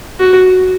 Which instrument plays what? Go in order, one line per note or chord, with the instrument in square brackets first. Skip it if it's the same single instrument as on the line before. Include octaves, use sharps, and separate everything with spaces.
[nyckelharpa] F#4